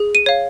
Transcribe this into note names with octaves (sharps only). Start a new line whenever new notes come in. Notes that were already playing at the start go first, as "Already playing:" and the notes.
Already playing: G#4
D#7
C#5 F5